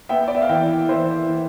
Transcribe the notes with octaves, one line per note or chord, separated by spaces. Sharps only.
B3 E5 G5
D5
E5
F5
E3 E5 G5
E3 C5 E5
E3